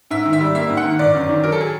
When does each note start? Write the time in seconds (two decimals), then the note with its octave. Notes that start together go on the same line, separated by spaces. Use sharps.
0.11 G#2 E5
0.25 D#3
0.33 E5
0.40 G3
0.55 A#3 E5
0.70 G#2
0.77 F#5
0.85 D#3
0.99 G1 D5
1.14 F#2
1.29 D#3
1.43 F#3 A#4
1.52 A4
1.61 G#4